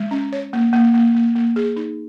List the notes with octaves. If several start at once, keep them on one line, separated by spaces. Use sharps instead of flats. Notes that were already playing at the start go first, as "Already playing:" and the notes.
Already playing: G#3
C#4
C#5
A#3
A#3
A#3
A#3
A#3
G#4
D#4